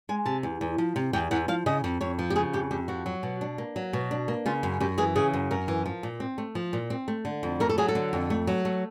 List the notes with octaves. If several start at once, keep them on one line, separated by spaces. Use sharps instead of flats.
G#3 G#5
C3 A5
E2
E2
F3
C3
E2 G5
E2 F#5
F3 F5
C#3 D#5
F2
F2 C#5
F3
G4
C#3 G#4
F2 G4
F2 G4
F3 F#4
F#3
B2
D4
A#3
F#3
B2
D4
A#3
C#3 F4
F#2
F#2 G4
E3 G#4
C#3 G#4
F#2
F#2 A#4
E3
F3
A#2
C4
A3
F3
A#2
C4
A3
D3
F2
A3 A#4
A4
F#3 G#4
A4
D3
F2
A3
F#3
A3